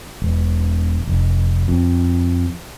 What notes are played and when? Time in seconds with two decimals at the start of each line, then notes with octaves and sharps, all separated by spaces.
0.22 E1
1.07 F1
1.68 F2